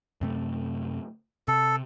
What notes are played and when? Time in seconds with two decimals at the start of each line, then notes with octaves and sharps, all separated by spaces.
0.21 F#2 C3 A3
1.48 C3 A4